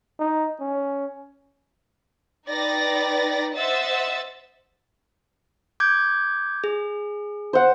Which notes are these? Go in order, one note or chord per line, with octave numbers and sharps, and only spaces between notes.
D#4
C#4
D#4 B4 D5 G5 A6 A#6
C5 D#5 E5 F#5 E6 A6
D6 G6 G#6
G#4
C5 F#5